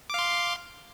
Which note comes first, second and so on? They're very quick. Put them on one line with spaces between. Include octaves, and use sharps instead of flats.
D6 F5 C6